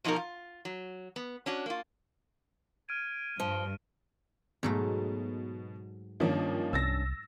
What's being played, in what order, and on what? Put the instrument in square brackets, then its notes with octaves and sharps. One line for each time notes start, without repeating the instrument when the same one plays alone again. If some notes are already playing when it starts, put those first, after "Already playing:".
[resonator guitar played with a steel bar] B2 F3 D#4 E4 F#4 A#4
F4
F#3
B3
C#4 D4 F#4
A#3 F4
[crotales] F6 D7 D#7 [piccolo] G#6
[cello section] G2 [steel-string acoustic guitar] F3 [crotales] D#7 [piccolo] G7
[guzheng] G#2 F#3 A3 [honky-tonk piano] B2
[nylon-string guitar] G2 C#4 D4 [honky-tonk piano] D#3 F3 A#3
[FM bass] C2 [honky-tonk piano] E6 A6 A#6